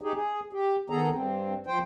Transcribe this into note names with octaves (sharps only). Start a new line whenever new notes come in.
D#4 G4 G#4
G#4
G4
D#3 B3 G#4 A4 A#5
G2 C4
F3 C5 G5